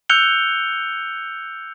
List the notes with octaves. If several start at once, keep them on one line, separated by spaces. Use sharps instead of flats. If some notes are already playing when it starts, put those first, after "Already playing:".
E6 F#6 G6 C#7 F7 G7